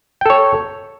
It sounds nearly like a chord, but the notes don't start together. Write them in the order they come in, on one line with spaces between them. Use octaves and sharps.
G5 A4 C#5